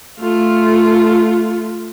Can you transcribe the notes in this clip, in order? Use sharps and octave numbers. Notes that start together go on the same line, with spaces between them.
A3 F4